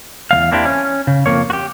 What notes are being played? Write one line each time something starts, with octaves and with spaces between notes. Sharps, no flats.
E2 G3 F5
A#3 C4 D4 E4 G4
C#4
C#3
F2 F3 A#3 C#5
F#4 G4